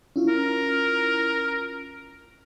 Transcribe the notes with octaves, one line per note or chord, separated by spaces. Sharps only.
C#4 E4 F4
A#4